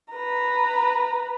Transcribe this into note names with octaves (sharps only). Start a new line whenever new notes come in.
B4 A#5